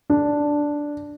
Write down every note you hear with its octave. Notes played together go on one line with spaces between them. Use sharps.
D4